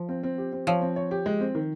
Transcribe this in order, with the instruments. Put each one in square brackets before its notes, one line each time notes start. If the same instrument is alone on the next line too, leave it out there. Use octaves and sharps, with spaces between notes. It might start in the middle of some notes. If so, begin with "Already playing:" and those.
Already playing: [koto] F3
[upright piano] C4
C4
G4
C4
[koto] F3 [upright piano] C#5
[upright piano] C4
C#5
G4
G#3
C4
D#3